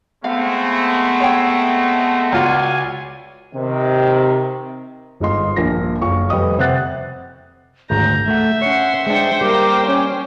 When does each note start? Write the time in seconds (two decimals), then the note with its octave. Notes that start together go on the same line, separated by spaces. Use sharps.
0.24 G#3 A3 B3 C4 F5
1.20 C#5 G5
2.32 C#2 F4 F#4 D5 G#5
3.54 C3 D#3
5.20 G1 G#2 G#3 F4 D#5 C6
5.56 A#1 G2 A#3 F4 A#6
6.02 F#1 F4 F5 C#6
6.30 F1 G3 B4 D#5 D#6
6.59 C3 C5 F#5 F#6 A6
7.90 G#1 D2 G#2 A#5 G6
8.28 A3 E5 F#5
8.62 C#4 C#5 F#5 C6 C#7
9.06 G#3 D4 C5 G5
9.41 G3 A#3 D6
9.85 C#4